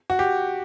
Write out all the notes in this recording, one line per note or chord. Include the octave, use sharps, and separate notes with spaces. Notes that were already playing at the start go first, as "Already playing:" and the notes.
F#4
G4